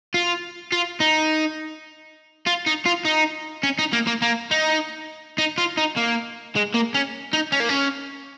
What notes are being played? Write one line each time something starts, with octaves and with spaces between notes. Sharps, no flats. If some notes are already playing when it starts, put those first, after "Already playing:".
F4
F4
D#4
F4
D#4
F4
D#4
C#4
D#4
A#3
A#3
A#3
D#4
D#4
F4
D#4
A#3
G#3
A#3
C#4
D#4
C#4
A#3
C#4